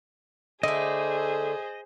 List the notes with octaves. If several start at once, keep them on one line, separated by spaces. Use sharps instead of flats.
D3 A3 G#4 C5 D#5